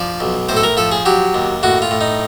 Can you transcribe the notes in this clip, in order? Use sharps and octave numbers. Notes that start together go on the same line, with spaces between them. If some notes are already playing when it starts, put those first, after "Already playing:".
Already playing: F3 D5
B1
A2 C5
A4
A#4
F3 A4
G#4
F#3 G4
D#2
A2 F#4
F4
A2
D#4